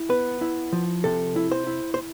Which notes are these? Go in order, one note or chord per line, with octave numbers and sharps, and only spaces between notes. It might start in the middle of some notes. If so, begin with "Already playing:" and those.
Already playing: E4
B3 B4
E4
F3
C3 A4
E4
C5
E4
C5